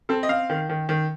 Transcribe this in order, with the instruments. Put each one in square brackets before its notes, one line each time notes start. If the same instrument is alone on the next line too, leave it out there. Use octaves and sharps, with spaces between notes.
[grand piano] C4 A4
D#5
C4 F5
D#3
D#3
D#3